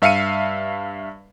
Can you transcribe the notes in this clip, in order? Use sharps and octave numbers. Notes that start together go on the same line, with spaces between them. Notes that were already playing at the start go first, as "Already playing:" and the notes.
G2 E5 F5 C7 C#7 D#7